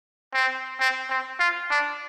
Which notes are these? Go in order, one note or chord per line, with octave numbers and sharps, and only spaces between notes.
C4
C4
C4
F4
D4